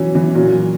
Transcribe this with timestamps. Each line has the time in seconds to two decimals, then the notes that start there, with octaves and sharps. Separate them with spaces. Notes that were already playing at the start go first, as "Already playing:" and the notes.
Already playing: B2 E3 F#3 C#4
0.15 E3
0.35 A#2 F#3